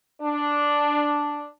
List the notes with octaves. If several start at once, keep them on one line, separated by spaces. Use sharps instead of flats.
D4